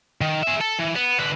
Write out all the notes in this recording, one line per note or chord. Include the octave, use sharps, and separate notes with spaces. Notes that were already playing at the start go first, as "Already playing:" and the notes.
D#3
G#4 E5
A4
E3
B3
D3 B4